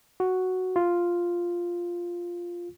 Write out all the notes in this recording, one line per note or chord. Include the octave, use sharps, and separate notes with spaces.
F#4
F4